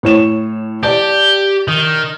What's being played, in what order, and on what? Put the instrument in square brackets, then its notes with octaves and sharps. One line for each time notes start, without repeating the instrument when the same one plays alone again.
[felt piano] A2 C#5 E7
[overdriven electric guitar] G4 [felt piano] D5 A5
[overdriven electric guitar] D#3